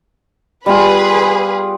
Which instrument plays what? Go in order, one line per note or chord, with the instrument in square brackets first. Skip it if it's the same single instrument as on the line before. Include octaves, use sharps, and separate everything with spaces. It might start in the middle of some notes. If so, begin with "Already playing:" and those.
[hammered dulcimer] G3 B3 F4 [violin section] G#4 B4